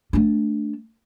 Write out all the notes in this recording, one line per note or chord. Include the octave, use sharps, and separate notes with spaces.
A3 D4